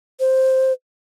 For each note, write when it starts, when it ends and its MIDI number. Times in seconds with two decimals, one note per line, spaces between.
0.20 0.73 72